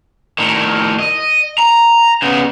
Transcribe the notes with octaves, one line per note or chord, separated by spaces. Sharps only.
A2 D#3
D#5
A#5
C#3 B3